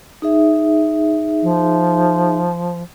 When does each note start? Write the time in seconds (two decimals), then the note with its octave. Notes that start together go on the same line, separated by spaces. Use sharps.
0.22 D#4 G#4 E5
1.43 F3